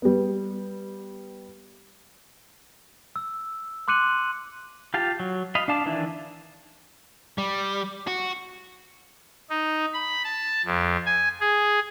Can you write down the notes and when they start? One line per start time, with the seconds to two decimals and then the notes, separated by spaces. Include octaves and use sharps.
0.02 G3 B3
3.16 E6
3.88 C6 D6 F#6 C#7 D#7 F#7
4.94 F4 G4 F5 A5
5.20 F#3
5.55 D#5 F5 B5
5.68 D4 F5 A5 D6
5.86 D#3 E3 D4 E4
7.38 G3
8.07 F#4
9.50 D#4
9.94 B5
10.24 A5
10.65 F2
11.06 G#5
11.40 G#4